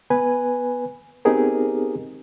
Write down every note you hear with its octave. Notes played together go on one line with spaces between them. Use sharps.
B3 B4 G#5
B3 C4 D#4 G4 G#4 A#4